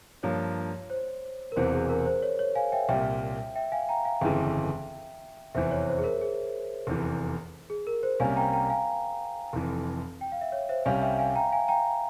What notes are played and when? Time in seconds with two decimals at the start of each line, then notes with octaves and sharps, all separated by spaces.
0.23 G2 F3 A#3 C#5
0.90 C5
1.52 A#4
1.56 E1 E2 C3 E3 C5
1.73 G#4
1.90 A#4
2.06 C5
2.23 C#5
2.39 C#5
2.55 F5 G#5
2.72 E5 G5
2.89 C2 A#2 G3 E5 G5
3.55 E5 G5
3.72 F5 G#5
3.89 G5 A#5
4.05 F5 G#5
4.21 G1 F2 C#3 E3 G#3 E5 G5
5.54 F1 E2 E3 C5 E5
5.71 C#5
5.87 C5
5.98 G#4
6.04 A#4
6.21 G#4
6.87 F1 E2 C3 E3
7.70 G#4
7.87 A#4
8.03 C5
8.20 C2 C3 G3 A#3 C#4 F5 G#5
8.36 G5 A#5
8.53 G5 A#5
8.69 F5 G#5
9.53 F1 F2 E3
10.21 G5
10.32 F5
10.41 E5
10.52 C#5
10.69 C5 E5
10.85 C2 C3 G3 C#4 F5 G#5
11.02 E5 G5
11.19 F5 G#5
11.35 G5 A#5
11.52 F5 G#5
11.68 G5 A#5